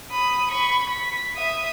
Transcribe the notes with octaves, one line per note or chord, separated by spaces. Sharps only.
B5 D#6
B5 C#6
B6
E5 D#6